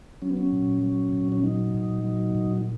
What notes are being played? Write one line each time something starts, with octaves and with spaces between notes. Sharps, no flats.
F#3 C#4
B3
C#4
A#2
F#3
A#2
C#4
F#3 D#4
A#2
F#3
A#2